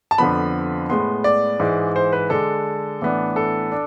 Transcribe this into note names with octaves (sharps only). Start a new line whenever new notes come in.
A5
F2 D3 F3 B3 B5
A2 G#3 B3 C6
D5
G#2 E3 G#3
C5
B4
D3 G#3 D4 A4
A2 E3 B3 D4
A4
D4